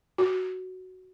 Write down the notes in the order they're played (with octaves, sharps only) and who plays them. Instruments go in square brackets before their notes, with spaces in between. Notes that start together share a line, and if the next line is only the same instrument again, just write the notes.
[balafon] F#4